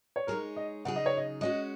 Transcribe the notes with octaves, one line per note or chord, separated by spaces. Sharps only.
C#5
G#3 D#4 G#4 A#4 C#5
D#5
C#3 F#3 D#4 G#4 F#5
D#5
C#5
D#5
G#3 C#4 F#4 D#5